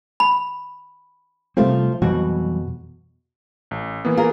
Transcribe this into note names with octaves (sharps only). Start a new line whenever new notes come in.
B5
C3 F3 G3 A3 C4 F4
F2 B2 E3 F#3 G3 F#4
A1
E3 A#3 B3
F4 G#4 A#4